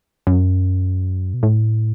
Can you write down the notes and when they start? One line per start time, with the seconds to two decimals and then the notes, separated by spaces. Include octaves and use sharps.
0.27 F#2
1.33 B2
1.43 A2